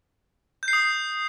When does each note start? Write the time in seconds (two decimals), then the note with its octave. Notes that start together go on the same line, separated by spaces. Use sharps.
0.63 G6
0.68 C7
0.73 D#6